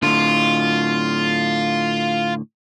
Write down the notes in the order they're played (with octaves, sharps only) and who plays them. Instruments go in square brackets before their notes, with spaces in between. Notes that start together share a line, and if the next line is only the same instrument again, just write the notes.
[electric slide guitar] A2 D3 [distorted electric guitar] F4